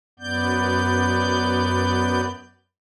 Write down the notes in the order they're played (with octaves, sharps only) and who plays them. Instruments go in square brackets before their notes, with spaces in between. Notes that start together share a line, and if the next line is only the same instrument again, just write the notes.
[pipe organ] F#2 B3 D5 G6